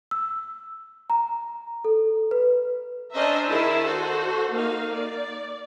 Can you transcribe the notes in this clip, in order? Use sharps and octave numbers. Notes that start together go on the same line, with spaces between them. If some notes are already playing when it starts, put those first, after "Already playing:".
E6
A#5
A4
B4
C#4 D4 C5 D#5 E5 A#5
D#3 E4 G#4 A#4 A5
F#4 A4 C5
A#3 D#4 F5
D5